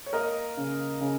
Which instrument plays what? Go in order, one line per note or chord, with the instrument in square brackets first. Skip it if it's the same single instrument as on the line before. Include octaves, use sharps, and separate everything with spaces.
[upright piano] C#5
[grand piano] A#3 [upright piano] A#4 D#5
[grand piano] C#3
C#3